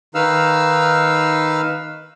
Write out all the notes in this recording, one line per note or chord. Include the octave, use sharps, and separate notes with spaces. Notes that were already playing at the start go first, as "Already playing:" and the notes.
D#3 D#4 B4 F5 E6 F6